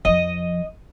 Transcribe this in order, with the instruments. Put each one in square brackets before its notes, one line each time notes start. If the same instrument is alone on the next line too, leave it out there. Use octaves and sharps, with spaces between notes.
[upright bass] F2 F3 [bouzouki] D#5